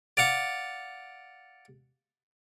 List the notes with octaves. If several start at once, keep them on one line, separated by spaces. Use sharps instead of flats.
D5 F5 F#5 D6